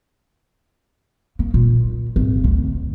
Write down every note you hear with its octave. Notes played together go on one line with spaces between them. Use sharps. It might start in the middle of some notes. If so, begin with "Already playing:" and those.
A#3
A#2
G#1
D2